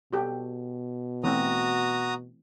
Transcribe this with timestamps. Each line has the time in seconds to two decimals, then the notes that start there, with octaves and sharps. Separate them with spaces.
0.13 B2 F#4 G4 A4
1.24 E3 A3 C4 F#4 A#5 D#6